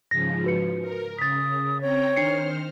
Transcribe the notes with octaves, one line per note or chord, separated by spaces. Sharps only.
G#2 C#3 F3 A#6
F#4 B4 C#7
A#4
C#3 D#6 A6 B6
C4 C#5 G5 A#5
D#3 D4 C5 F6 C7 C#7